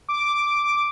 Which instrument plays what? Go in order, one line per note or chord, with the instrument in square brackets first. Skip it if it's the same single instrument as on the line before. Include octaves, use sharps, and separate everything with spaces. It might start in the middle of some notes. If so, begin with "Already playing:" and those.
[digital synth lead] D6